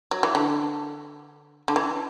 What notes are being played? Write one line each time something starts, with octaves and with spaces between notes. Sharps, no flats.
F#3
E3
D3
D3
E3